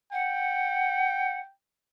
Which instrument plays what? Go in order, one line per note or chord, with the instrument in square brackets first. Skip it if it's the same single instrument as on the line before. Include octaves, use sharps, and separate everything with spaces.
[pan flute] F#5 [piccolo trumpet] G5